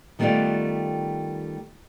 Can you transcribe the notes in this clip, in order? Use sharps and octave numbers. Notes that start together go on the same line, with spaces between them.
D#3 G3 A3 B3 F4 D5